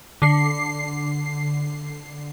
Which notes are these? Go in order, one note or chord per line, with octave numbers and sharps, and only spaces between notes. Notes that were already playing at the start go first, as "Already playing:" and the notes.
D3 C7